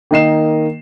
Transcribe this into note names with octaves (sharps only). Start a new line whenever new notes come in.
D#3 A#3 D#5 C7 E7